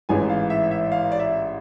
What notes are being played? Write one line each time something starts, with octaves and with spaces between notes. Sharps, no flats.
A1 G#2 E3 G#5
F5
E5
E5
F5
D5
E5